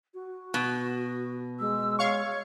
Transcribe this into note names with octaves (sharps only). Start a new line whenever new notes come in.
F#4
B2
G#3 E6
C#5 F5 C#6